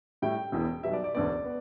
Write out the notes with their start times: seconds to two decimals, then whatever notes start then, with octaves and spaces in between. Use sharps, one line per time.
0.22 A2 G3 E4 G5
0.52 E1 E2 E3
0.83 B1 B2 G3 B3 E5
0.93 D5
1.04 D5
1.14 E1 D2 D3 B3 D5
1.45 B3